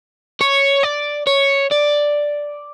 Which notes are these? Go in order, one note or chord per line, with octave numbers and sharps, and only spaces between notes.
C#5
D5
C#5
D5